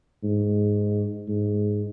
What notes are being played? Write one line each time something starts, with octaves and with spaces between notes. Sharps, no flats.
G#2
G#2